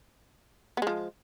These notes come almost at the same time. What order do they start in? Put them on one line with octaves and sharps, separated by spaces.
B3 G#3 F3